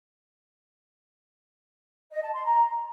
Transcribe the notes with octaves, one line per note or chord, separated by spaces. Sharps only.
D#5
A5
C6
A#5